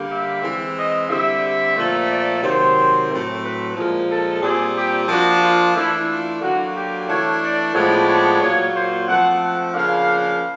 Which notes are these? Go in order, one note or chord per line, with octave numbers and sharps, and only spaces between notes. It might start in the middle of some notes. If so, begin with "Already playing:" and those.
Already playing: D3 G3 A#3
E5
E3 G#3 C4
D#5
D3 G3 C4 E5
A#2 F3 A3
D5
C3 D#3 F#3 C5
A2 F#3 A3 C4
B4
A#2 F3 G#3 A#4
A4
A#2 G3 C4 G#4
G4
F3 A#3 D4 F#4
F4
E3 A3 D4 E4
F4
D3 F#3 A#3 F#4
G4
E3 A3 D4 C#5
D5
A2 F3 G#3 B3 D4 C#5
C#5
A#2 F#3 A#3 C#5
C5
F3 A3 C4 F#5
F#5
C#3 F3 A#3 D4 F5